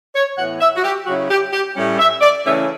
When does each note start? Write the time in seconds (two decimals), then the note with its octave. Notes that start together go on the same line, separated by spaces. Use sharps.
0.15 C#5
0.38 A2 E3 B3 F#5
0.61 E5
0.76 F#4
0.84 G4
1.06 C#3 F#3 C#4 E4 F#4
1.29 G4
1.53 G4
1.75 A2 G3 C#4
1.99 E5
2.21 D5
2.45 C#3 E3 A3 C#4 E4 E5